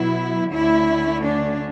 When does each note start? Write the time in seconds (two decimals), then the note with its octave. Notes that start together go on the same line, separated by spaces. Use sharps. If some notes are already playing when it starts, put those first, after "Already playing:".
Already playing: B2 F#3 B3 E4
0.49 D2 D3 A3 C#4 E4
1.22 D4